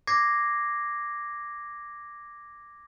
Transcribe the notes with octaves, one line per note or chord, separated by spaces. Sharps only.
D6 G#6 A#6 C7